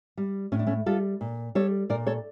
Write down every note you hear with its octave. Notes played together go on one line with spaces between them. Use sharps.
G3
A2 C#4
D4
A3 C#4
G3 F4 A4
A#2
G3 A4 C#5
A#2 A#4 D5
A4 C#5